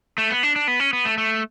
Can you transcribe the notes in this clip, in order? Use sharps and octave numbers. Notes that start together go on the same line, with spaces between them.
A3
B3
D4
D4
B3
C#4
B3
A3
A3